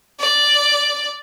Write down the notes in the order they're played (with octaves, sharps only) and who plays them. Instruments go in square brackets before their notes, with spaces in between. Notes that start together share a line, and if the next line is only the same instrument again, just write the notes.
[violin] D5